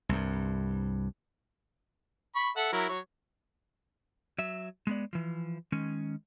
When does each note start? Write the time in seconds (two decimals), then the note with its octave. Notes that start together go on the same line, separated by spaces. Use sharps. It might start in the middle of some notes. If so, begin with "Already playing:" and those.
0.09 C2 G2
2.35 B5 C#6
2.57 A4 E5 F#5
2.72 F#3 E4 A#4
2.89 F#3 C#5
4.38 F#3 E5
4.87 G#3 B3 D5
5.13 E3 F3
5.72 D#3 G#3 C#4